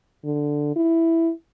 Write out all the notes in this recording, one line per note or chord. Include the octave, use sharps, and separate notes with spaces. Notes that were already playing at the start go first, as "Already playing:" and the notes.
D3
E4